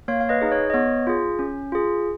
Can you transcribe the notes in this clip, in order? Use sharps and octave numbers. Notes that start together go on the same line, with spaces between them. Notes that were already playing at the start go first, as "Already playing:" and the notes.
A#3 C#5 F5
F5
B4 D#5
D#4 G#4
C#5
D#5
B3 C#5
F4 G#4
C#4
F4 G#4